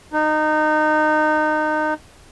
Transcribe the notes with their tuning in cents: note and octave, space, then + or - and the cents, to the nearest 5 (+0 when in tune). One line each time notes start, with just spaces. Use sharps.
D#4 -25